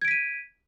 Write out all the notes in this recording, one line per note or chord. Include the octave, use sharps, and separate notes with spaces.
G#6 B6 D7 D#7